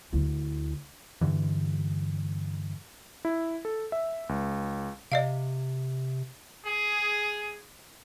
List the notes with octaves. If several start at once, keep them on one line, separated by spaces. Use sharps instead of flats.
D2 E4
G2 D3 E3
E4
A4
E5
C#2
C3 D5 D#5 F5
G#4